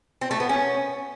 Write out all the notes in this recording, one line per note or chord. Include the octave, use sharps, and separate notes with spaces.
C4
A3
B3
C#4